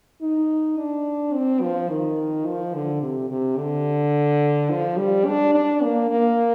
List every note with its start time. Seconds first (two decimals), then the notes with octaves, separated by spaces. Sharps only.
0.22 D#4
0.78 D4
1.34 C4
1.62 F3
1.89 D#3
2.46 F3
2.74 D3
3.02 C3
3.30 C3
3.58 D3
4.70 F3
4.98 G3
5.26 D4
5.54 D4
5.83 A#3
6.11 A#3